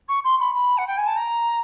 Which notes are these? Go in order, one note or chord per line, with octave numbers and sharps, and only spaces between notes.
C#6
C6
B5
B5
F#5
G5
G#5
A5
A#5